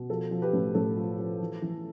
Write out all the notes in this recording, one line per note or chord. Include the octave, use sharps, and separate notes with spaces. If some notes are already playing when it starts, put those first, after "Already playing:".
Already playing: B2
F3 A4
F3
G4 B4
A2
A2 A4
F3
F3
E3
E3